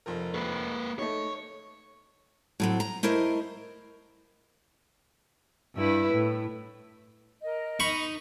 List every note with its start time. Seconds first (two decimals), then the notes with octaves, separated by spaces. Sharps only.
0.06 F1 F3 A#4
0.34 A#3 B4
0.99 A3 D#4 C#5
2.60 A2 F#3 C4
2.80 A#5
3.03 A3 E4 A#4 C5 D#5
5.75 G2 E4 B4
6.13 A2
7.42 A#4 D#5
7.80 D#4 B5 C#6